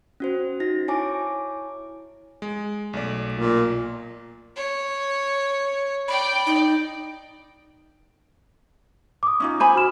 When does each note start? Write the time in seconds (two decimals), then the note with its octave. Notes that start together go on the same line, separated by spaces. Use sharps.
0.20 C#4 F#4 C5
0.60 D#4 F#4 A#6
0.88 E4 C#5 G#5 A5 D6
2.42 G#3
2.93 B1 A3 D5
3.33 A#2
4.56 C#5
6.08 D5 G5 B5
6.46 D#4
9.23 D6 D#6
9.40 C#4 D#4 F4
9.60 C5 G#5 B5
9.76 F#4 F6 E7